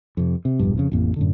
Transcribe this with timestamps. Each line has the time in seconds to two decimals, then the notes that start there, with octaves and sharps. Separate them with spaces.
0.17 F2 C3
0.45 C3
0.59 E1 A#1 G2
0.77 F2 C#3
0.92 A1 F2 A#3
1.16 F#2 A2 D3